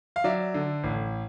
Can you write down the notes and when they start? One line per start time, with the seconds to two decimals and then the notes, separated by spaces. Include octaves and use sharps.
0.16 F5
0.24 F#3 D5 E5
0.54 D3
0.84 A1